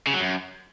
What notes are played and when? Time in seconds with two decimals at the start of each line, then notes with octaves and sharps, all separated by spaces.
0.07 C#3
0.14 F#3
0.20 F#2